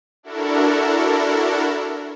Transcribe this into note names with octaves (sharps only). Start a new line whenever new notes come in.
D4 E4 F#4 A4 A#4